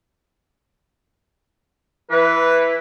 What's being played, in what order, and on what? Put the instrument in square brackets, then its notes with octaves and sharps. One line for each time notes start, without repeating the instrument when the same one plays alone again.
[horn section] E3 [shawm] B4